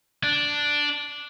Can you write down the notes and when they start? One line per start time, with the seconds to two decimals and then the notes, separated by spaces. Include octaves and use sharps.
0.23 D4